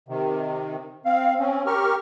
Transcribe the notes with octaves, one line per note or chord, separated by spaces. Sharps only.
C3 D#3
C4 F5
C4 C#4
G4 A#4 C#6 F6